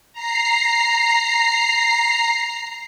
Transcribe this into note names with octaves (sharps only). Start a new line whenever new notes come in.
A#5 C7